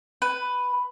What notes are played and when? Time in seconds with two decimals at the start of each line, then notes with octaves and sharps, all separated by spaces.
0.22 B4